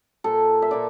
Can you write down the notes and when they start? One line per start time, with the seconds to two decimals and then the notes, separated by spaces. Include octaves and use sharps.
0.24 A#2 F3 A#3 A4
0.62 E5
0.71 A#2 F3 A#3 D5